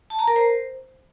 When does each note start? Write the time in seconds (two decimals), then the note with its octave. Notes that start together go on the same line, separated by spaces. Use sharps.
0.10 A5
0.19 A#5
0.28 A#4
0.36 C5